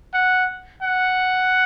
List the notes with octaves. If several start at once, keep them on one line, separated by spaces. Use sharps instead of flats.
F#5
F#5